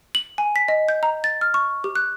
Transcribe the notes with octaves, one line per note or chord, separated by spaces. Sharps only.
F#7
G#5
B6
D#5
G6
A#5
A6
F6
C#6
G4
F#6